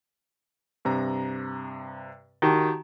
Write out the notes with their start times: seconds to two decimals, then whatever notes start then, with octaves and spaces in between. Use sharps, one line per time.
0.85 G2 C3 A#5
2.42 D#3 F#4 G4 A5